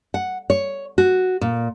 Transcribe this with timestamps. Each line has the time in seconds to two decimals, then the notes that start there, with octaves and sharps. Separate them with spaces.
0.14 F#5
0.50 C#5
0.98 F#4
1.41 A#2